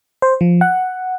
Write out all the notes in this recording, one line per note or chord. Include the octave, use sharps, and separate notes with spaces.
C5
F3
F#5